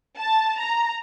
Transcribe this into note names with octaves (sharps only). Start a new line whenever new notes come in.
A5
A#5